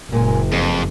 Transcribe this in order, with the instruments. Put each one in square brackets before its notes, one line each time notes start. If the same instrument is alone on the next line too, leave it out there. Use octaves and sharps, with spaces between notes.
[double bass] F#1 [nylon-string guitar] A#2 G#3 G#5
[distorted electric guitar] F2 [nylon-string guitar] G#4